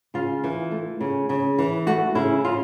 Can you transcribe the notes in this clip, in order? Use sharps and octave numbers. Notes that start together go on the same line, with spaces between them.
C#3 F4
E3
A3
C#3
C#3
E3
A3 F#4
C#3 E4
C#3 F4